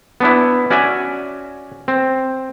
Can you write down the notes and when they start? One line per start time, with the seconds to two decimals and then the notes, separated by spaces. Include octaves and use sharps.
0.20 B3 D4 E4
0.70 C#4 F#4 D5 E5 G#5
1.88 C4